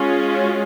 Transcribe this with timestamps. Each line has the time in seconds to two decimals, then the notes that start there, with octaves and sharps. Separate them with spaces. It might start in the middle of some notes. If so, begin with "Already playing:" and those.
Already playing: G#3 C#4 F4
0.32 F#4